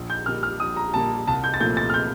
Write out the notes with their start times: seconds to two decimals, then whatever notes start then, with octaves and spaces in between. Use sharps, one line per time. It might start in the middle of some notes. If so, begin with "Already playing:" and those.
Already playing: A#1
0.10 G6
0.26 A#2 G3 A#3 F6
0.43 F6
0.60 A#1 D#6
0.76 A#5
0.94 A#2 G3 A#3 A5
1.27 C2 A5
1.44 G6
1.54 A6
1.60 A#2 F3 A3 G6
1.77 A6
1.90 F6
1.94 G6